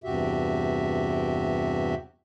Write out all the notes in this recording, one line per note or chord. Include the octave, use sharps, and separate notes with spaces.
E2 G2 C3 F#4 G4 E5